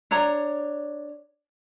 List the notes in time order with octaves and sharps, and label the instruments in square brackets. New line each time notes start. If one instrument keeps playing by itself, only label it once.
[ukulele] D4 C#5 A#5